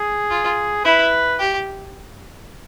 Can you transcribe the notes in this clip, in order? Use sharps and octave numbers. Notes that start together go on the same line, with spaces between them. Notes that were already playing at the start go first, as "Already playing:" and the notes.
Already playing: G#4
F4
E4 B4
G4